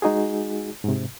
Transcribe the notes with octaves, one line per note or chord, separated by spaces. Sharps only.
G#3 D#4 F#4 G#4
G#2 C3